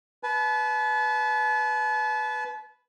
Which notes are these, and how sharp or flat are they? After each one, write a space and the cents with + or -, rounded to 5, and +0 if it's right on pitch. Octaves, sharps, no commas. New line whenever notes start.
B4 +0 A5 -40